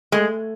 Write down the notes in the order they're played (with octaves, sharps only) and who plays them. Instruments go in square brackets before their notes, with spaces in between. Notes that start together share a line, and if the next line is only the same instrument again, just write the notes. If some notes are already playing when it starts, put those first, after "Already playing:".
[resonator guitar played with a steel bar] G#3 [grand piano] A3